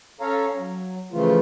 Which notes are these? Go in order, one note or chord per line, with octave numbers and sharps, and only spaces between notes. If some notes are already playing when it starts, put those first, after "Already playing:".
C#4 A4 C#5 F5 A#5
F#3
C#3 E3 F3 A3 F4